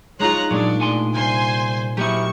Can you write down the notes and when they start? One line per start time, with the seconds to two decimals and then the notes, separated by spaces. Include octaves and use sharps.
0.19 G#3 D#4 F4 C#5 A#5 F#6
0.51 A#2 F#3 G#3 D4
0.80 A2 G#5 C6
1.14 C2 C5 G#5 C6
1.97 F#3 A#3 E4 G4 D#5 C#6